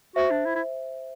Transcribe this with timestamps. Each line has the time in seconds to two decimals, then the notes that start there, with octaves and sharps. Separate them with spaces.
0.16 F#4 C5 E5
0.31 D4
0.45 E4
0.55 E4